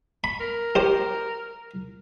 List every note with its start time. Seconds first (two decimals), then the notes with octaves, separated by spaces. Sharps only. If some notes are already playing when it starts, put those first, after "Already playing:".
0.24 B5
0.40 A#4
0.75 G4 C5